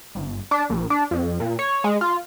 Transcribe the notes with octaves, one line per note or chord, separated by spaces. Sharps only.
G1
D4
A#1
D4
F2
A#2
C#5
G#3
F4